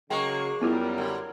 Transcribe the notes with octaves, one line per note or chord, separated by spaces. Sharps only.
C#3 F#3 G#3 A#3 G5 C#6
F#2 G3 B3 E4 F4 A#4
D3